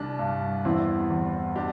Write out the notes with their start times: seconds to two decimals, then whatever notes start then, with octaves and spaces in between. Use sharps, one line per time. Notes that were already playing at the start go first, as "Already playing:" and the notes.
Already playing: C2 G3 D4
0.19 G2
0.65 E2 C4 E4
1.10 E2
1.56 D4 G4